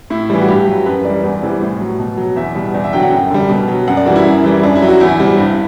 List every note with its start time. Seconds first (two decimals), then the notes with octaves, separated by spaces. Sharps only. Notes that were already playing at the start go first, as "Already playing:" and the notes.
0.10 A2 E4
0.30 E3 G3
0.41 F#4
0.48 G2 G4
0.68 F#3
0.86 F#2 B4
1.05 E3 G3 D5
1.24 E2
1.42 C3 E3 G3
1.62 A2
1.81 F#3
1.99 B2
2.17 F#3
2.36 E2 E5
2.55 B2 G3
2.74 E2 D5
2.84 E5
2.93 D3 F#3 G5
3.03 F#5
3.12 F#2 G5
3.31 D3 G3
3.49 B2
3.68 F#3
3.87 F#2 F#5
3.97 D5
4.06 E3 G3 F#4
4.16 E4
4.25 F#2
4.43 E3 G3
4.63 F#2 D4
4.75 E4
4.82 F#3
4.88 F#4
5.00 E2 E4
5.20 C3 G3
5.38 G2